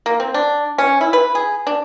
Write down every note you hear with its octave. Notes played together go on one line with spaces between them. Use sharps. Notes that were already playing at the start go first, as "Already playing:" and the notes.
A#3
C4
D4
C#4
E4
B4
G#4
D4